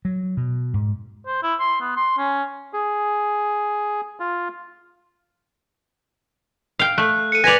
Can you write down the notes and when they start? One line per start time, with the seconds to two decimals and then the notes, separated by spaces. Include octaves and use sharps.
0.05 F#3
0.37 B2
0.74 G#2
1.27 C5
1.43 E4
1.60 C6
1.81 B3
1.97 C6
2.18 C#4
2.73 G#4
4.20 F4
6.79 F5 G5
6.98 A3 F#6
7.32 A4 C#7 D#7
7.44 B4 D5 G#5 A#6 B6 F7